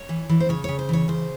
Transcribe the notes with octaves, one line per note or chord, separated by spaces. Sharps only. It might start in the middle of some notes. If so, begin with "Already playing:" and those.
Already playing: C#5
E3
E3
C5
C#3 C#5
C#3 C#5
C5
E3 C#5
C#3 C5